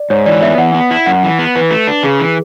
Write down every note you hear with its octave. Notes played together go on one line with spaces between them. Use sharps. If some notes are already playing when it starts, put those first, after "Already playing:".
Already playing: D5
G#2 C#5
E3 D5
B3 E5
E3 F#5
B3
E4
F#2 F#5
E3
B3
E3 B4
A3
D4
C#3 G#4
E3